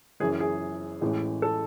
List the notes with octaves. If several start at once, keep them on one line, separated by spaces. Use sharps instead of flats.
F#1 F#2 E3 G#4
G#4
A1 A2 E3 G#3
A4